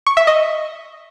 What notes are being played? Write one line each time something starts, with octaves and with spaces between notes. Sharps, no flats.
C#6
E5
D#5